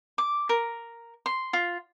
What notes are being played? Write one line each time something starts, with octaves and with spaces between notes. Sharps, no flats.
D6
A#4
C6
F4